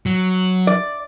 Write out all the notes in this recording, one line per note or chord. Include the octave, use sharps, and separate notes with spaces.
F#3
D5